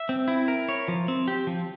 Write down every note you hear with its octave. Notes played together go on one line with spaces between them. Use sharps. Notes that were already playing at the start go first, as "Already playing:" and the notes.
Already playing: E5
C4
E4
A#4
C#5
F3
C4
G4
F3